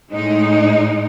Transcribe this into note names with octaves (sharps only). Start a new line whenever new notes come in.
A2 G#3 D#4